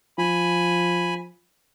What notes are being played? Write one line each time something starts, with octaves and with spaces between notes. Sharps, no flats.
F3 G#5 B5